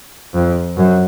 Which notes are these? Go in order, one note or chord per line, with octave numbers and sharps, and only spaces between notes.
F2
F#2